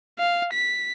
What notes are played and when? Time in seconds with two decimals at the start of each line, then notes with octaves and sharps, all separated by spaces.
0.19 F5
0.53 B6